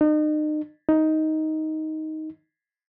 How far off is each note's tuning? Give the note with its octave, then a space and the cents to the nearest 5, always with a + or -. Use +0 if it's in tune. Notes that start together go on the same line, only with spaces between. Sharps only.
D#4 -35
D#4 +10